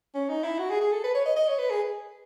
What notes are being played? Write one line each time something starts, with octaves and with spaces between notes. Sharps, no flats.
C#4
D#4
E4
F#4
G#4
G#4
A4
B4
C#5
D#5
D#5
C#5
B4
G#4